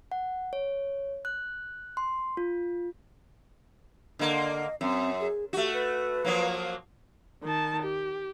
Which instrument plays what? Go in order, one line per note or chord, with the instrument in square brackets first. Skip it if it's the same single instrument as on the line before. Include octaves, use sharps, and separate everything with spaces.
[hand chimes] F#5
C#5
F#6
C6
F4
[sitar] D3 A#3 [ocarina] D#5
[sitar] F#2 [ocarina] C4
[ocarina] G#4
[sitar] A3 F#4 [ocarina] G4
[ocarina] B4
[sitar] F3 F#3 A#3
[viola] D#3 A5
G4